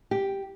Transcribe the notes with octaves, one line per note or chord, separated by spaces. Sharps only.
G4